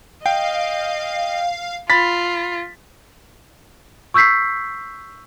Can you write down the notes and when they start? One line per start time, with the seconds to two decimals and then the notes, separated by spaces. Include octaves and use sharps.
0.26 D#5 F5 G5
1.90 F4 B5 A6 B6
4.14 C#6 E6 G6 B6 C7